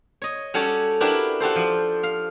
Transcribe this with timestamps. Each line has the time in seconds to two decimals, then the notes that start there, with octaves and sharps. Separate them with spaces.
0.22 C#5 D#5
0.54 G3 C#4 F#4 A4 C#5 D5
1.00 D4 E4 F#4 G4 A#4 B4
1.40 F#4 G4 A4 C5
1.56 F3
2.03 F5